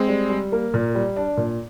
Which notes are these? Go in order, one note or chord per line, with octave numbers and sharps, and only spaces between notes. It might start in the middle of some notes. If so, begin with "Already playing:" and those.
Already playing: G#3 C4
G3
G3
A#3
A#2
G3
D4
A#2